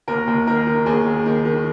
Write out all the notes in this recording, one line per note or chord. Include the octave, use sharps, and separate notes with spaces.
D#2 A#4
D#2
D#3 A#4
D#3
D#2 G#4
D#2
D#3
D#3